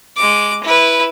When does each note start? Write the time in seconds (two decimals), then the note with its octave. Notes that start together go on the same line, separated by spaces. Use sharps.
0.16 G#3 D6
0.63 E4 B4